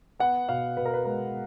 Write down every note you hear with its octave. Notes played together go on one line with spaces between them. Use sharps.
B3 F#5
B2 F5
B2 B4
A#4
B4
G#3 A#4